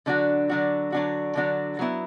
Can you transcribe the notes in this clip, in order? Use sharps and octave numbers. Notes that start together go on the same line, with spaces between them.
D3 F#3 D4 F#4
D3 F#3 D4 F#4
D3 F#3 D4 F#4
D3 F#3 D4 F#4
F#3 B3 E4